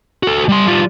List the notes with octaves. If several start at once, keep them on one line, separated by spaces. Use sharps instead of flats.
F#4 A4
G3 C6
G3 F4